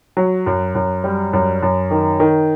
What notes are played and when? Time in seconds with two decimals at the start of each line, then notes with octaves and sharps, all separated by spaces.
0.17 F#3
0.46 F#2
0.75 F#2
1.04 G3
1.33 F#2
1.62 F#2
1.91 D#3
2.20 D#3